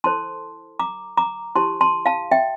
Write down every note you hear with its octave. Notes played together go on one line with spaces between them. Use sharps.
E4 A4 C5 A5 C6
A#5 D6
A#5 D6
E4 G4 C5 A5 C6
A5 C6
F5 A5
E5 G5